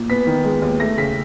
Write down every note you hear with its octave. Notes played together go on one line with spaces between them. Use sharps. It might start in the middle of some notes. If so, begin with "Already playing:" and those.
Already playing: A#2
B3 B6
D#3
G#3
D#2
A3 A#6
C#3 B6